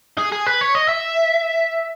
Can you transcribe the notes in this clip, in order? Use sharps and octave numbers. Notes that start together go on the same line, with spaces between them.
G#4
G#4
B4
C#5
D#5
E5